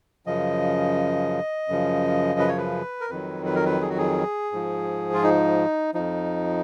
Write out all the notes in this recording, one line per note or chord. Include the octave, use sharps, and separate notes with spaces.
F#2 C#3 F3 D#5
F#2 C#3 F3
B4
C#5
B4
A#4
F2 D#3 F#3 B4
B4
A#4
B4
G#4
F#4
G#4
G#2 F3
F4
D#4
F2 F3 D#4